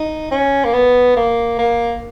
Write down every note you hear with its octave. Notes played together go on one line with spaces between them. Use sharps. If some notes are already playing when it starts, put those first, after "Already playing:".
Already playing: D#4
C#4
A#3
B3
A#3
A#3